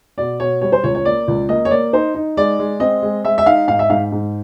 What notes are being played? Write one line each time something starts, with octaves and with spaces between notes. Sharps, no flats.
B2 D5
B2 C#5
G3 C#5
C5
C#2 C#5
C#5
A#3 D5
C#2
A#3 D#5
C#5
A#3 D5
D#4 C5
D#4
G#3 D5
G#3
C4 D#5
G#3
G#3 E5
E5
D#4 F5
G#2 F5
E5
G#2 F5
G#2